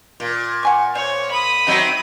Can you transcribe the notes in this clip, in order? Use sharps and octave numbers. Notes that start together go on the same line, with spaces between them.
A#2
F#5 G#5 C#6
C5 C#5
B5 D#6
F#3 C4 D#4 E4 F#4